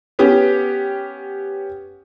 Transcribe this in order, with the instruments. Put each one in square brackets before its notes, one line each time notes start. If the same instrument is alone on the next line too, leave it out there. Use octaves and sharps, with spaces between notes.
[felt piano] B3 C#4 G4